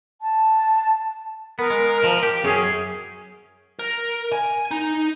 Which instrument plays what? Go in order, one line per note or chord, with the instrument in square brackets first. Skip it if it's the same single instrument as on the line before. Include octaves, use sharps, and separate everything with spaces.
[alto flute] A5
[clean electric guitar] B3 [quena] A#4
[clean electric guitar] G#3
F3
G4
[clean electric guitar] F#2 C#4 [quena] G#4
[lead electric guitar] A#4
G#5
D#4